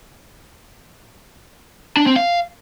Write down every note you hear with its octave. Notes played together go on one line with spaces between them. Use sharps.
D4
C4
F5